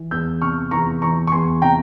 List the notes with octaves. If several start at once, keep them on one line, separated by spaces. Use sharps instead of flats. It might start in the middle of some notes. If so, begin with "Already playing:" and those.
Already playing: E3
E2 E6 G6
C3 C#6 F6
E2 A#5 C#6
E3 A#5 C#6
C#6
E2 G#5 C6
C3 G5 A#5